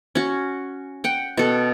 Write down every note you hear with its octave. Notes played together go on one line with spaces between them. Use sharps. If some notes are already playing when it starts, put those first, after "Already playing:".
C#4 F#4
F#5 G5
B2 A4